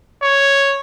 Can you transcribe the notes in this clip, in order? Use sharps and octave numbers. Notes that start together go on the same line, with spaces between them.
C#5